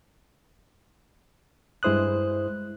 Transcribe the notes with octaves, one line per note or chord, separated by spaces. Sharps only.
G2 G#3 E4 C5 D#6 F#6